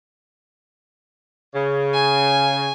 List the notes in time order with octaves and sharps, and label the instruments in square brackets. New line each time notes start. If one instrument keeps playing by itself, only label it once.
[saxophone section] C#3
[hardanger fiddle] G#5